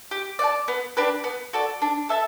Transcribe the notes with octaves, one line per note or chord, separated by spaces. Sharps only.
G4
D5 F#5 A5
B3
D4 G4 B4
B3
F#4 A4 D5
D4
A4 E5 A5